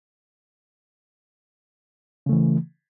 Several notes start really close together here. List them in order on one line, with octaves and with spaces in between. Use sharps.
C#3 A3 E3